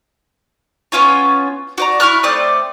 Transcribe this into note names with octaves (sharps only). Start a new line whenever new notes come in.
B3 C#4 F4 C#5
F#4 D5 A#5
E4 C#6 F6 F#6
A3 C4 D5 D#6